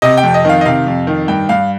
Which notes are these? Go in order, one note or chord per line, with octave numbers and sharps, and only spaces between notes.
C3 D#5
G5
F2
D#5
D#3 F5
D#5
C3 F5
F2
D#3
G2 G5
G2 F5